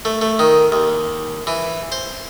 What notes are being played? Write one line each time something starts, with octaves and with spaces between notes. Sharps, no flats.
A3
A3
D#3
D#2
E3
C5